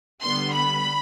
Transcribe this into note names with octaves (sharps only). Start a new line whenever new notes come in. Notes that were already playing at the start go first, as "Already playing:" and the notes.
D3 G3 B3 C6
B5